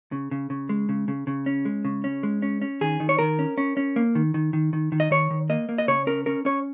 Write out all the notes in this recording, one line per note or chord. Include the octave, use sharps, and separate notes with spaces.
C#3
C#3
C#3
G#3
C#3
C#3
C#3
C#4
G#3
C#3
C#4
G#3
C#4
C#4
D#3 G#4
D#3
C#5
D#3 A#4
C#4
C#4
C#4
A#3
D#3
D#3
D#3
D#3
D#3
D#5
D#3 C#5
D#3
A#3 D#5
A#3
D#5
C#3 C#5
C#4 A#4
C#4 A#4
C#4 C#5